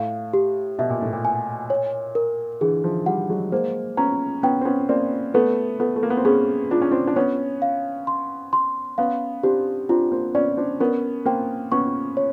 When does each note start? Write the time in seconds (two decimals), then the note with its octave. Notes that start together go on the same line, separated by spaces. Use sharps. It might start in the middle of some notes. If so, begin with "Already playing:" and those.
Already playing: A2 F5
0.33 G4
0.79 B2 E5
0.90 A#2
1.02 A2
1.13 A#2
1.25 G#5
1.70 C#5
2.15 A#4
2.61 D3 E3 G#4
2.84 D#3 F3
3.06 F3 G3 F#5
3.30 F#3 G#3
3.52 G#3 A#3 C5
3.97 B3 C#4 A#5
4.43 B3 C#4 G5
4.61 C4
4.65 B3 C#4
4.89 A#3 C4 D5
5.34 A3 B3 B4
5.80 A3 B3 B4
5.96 A3
6.03 A#3
6.10 B3
6.17 C4
6.25 B3 C#4 G#4
6.71 D4 F4
6.82 C#4
6.91 C4 D4
7.07 D4
7.16 B3 C#4 C#5
7.62 F5
8.07 C6
8.53 C6
8.98 B3 C#4 F5
9.43 C4 D4 G4
9.89 C4 D4 F4
10.12 A#3 C4
10.35 B3 C#4 D5
10.57 C4 D4
10.80 B3 C#4 A#4
11.26 A#3 C4 G5
11.72 B3 C#4 C#6
12.17 C#5